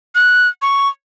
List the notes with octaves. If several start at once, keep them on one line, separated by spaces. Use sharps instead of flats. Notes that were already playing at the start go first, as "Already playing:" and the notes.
F#6
C#6